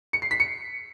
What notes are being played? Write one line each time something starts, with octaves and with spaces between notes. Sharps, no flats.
C#7
C7
B6
C#7